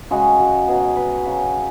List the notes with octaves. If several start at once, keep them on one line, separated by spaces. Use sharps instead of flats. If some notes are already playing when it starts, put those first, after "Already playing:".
C#3 G#3 F#4
F#4
B2 F#3 G#4
B4
C#3 F#3